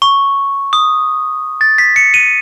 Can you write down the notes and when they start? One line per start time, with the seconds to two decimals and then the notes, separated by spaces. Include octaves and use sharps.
0.02 C#6
0.73 D#6
1.61 A6
1.78 B6
1.96 C#7
2.14 D#7